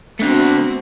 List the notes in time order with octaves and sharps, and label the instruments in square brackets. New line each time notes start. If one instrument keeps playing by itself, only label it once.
[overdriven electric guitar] D3 A3 [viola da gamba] B3 C4 F#4